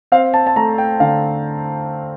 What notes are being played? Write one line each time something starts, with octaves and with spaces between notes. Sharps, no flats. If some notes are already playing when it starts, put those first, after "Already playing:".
C4 F5
A5
A5
A3 A#5
G5
D3 F5